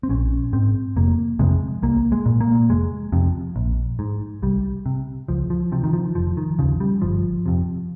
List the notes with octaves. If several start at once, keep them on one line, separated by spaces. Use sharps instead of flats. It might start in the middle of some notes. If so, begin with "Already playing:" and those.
C4
A#1 C#4
G#2 C4
F1 A#3
F2 C3 G#3
C2 A#3
G#3
A#2
A#3
F1 G#3
F2 C3
A#1
G#2
C2 G3
C3
C#2 F3
F3
C3 F3
D#3
F3
F1 F3
D#3
D#2 C#3 F3
G3
G1 F3
F2 C3